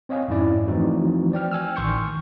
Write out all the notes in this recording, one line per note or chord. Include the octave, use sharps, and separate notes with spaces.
C4 C#5 D#5 F5 G#5
F2 G#2 C#4 E4 D5
E3 F3 A3 C4 D#4 F#4
C5 D5 G5 F6
G5 G#5 E6 F6
A1 D#3 C6 C#6 G6 C#7